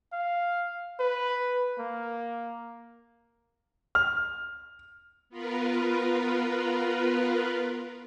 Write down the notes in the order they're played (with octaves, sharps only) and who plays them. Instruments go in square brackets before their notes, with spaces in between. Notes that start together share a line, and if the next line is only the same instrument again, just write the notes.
[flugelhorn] F5
B4
A#3
[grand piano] F6
[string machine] B3 F4 A#4 B4